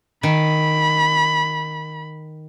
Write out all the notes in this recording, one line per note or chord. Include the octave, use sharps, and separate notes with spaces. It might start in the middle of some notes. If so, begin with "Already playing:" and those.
D#3 B5